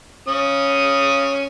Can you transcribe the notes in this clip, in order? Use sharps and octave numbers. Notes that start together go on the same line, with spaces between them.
C#4 D#6